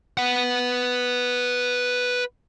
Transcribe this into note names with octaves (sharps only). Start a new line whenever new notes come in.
B4 F#5